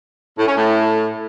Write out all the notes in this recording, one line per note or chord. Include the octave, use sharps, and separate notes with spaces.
A2
C#4
A2